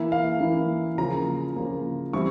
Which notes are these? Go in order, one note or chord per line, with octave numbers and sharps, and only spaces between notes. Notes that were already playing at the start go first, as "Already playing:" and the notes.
Already playing: E3 A#3 E4 E5
F5
E3 A#3 E4
C#3 F3 A#3 A#5
C#3 F3 A#3
E3 G3 C4 E4 C#6